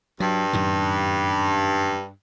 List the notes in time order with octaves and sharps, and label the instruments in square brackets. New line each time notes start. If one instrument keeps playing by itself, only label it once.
[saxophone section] G2 [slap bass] F#3
[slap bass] F#2 A2 D#3